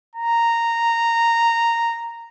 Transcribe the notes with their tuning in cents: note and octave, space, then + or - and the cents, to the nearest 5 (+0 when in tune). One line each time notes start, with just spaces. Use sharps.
A#5 -10